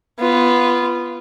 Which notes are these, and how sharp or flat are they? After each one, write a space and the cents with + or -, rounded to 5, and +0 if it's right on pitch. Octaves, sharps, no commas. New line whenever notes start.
B3 +0 F4 -20